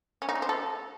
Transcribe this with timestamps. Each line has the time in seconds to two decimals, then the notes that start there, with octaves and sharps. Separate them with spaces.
0.22 C#4
0.29 D#4
0.35 C#4
0.42 C5
0.49 A4